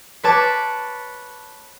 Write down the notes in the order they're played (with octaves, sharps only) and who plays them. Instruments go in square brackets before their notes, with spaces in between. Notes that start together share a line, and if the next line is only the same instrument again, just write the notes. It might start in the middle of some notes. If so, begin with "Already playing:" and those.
[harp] B4 C#5 A5 D6